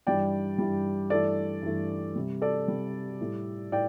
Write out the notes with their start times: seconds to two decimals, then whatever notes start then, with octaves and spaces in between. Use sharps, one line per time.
0.07 G2 E3 G3 D5 G5
0.58 G2 E3 G3
1.10 G2 E3 A3 A4 D5
1.63 G2 E3 A3
2.16 C3 G3
2.42 A4 D5
2.68 C3 G3
3.21 A2 G3
3.72 A2 D5 G5